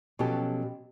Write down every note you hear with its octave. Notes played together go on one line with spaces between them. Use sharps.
B2 F3 F#3 C#4 G4 A4